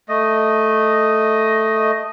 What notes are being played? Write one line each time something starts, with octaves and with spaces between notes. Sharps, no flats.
A3 D#5